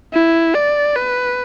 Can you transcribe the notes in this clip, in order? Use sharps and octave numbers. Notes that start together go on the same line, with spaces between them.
E4
D5
B4